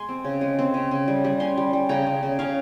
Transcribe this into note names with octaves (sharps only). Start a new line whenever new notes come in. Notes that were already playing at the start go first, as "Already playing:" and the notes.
Already playing: G#3 G#5 C6
C4
C#3
G#3
C4
C#3
C#3
G3
G3
C#4 G#5 C6
G3
G3
C#3 G5 A#5
C#3
C#3
C#3 F5 G#5